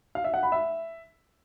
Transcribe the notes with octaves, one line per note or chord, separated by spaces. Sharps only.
F5
E5
F#5
B5
E5